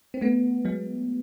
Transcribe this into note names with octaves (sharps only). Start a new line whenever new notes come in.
C4
A3 B3
F#3 G#3